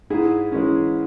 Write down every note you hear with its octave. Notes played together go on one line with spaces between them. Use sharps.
G#2 E4 G#4
E3 G#3 C#4